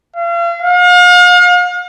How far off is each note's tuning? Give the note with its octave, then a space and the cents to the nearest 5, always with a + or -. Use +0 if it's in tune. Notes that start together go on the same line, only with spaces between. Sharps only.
F5 -40
F5 +40